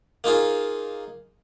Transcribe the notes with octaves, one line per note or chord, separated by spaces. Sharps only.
A#3 D#4 F4 G#4